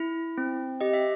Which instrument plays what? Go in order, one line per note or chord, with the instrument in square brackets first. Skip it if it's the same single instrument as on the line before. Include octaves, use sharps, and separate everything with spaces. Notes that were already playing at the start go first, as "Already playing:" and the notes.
Already playing: [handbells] E4
C4
G4 D#5
E5